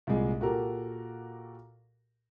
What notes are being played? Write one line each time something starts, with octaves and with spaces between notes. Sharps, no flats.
C2 A#2 G#3 G#4
A#2 F#4 G4 A4 A#4